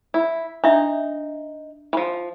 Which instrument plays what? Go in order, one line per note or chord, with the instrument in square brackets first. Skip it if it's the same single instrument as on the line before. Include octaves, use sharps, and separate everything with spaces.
[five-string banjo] E4
[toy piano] D4 E5 [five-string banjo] D#4
[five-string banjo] E3 F3